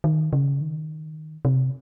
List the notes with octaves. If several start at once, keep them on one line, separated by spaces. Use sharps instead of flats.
D#3
C#3
D#3
C3